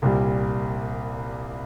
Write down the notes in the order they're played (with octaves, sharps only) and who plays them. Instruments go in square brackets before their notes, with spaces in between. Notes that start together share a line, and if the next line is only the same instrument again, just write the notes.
[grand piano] C2 A#2 G3